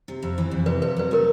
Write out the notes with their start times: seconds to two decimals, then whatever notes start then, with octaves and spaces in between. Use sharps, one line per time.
0.08 C3
0.22 F2
0.38 E3
0.51 F2
0.66 C3 B4
0.82 F2 B4
0.96 F#3 B4
1.11 A3 A#4